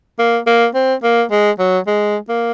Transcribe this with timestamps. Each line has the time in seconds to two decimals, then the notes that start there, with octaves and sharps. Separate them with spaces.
0.19 A#3
0.47 A#3
0.75 C4
1.03 A#3
1.31 G#3
1.59 F#3
1.87 G#3
2.29 A#3